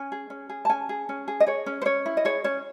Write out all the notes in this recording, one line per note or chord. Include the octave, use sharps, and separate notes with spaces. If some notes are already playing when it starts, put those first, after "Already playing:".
Already playing: C#4 G#5
G#4
C#4
G#4
A5
C#4 G#5
G#4
C#4
G#4
D#5
G#4 C#5
C#4
C5
C#4 C#5
E4
D#5
G#4 C#5
C#4 C#5